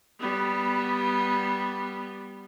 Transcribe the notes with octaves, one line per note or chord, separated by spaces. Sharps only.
G3 B3